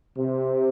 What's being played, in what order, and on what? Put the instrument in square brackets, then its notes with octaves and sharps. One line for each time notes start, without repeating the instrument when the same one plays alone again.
[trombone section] C3